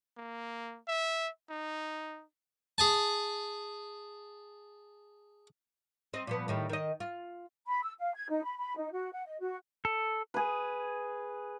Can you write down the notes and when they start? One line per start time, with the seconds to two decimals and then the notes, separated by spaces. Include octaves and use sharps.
0.17 A#3
0.88 E5
1.50 D#4
2.78 G#4 G#5 A5
6.13 C4 D#5
6.27 A#2 F3 B3
6.48 A2 D#3 G3
6.70 D#3 D#5
7.00 F4
7.67 B5
7.83 E6
7.99 F5
8.14 G#6
8.29 D#4
8.44 B5
8.57 B5
8.77 D#4
8.92 F#4
9.13 F#5
9.26 D#5
9.40 F#4
9.85 A4
10.34 G#4 B4